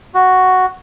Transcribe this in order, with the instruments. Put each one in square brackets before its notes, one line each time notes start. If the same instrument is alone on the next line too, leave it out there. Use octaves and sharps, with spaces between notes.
[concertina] F#4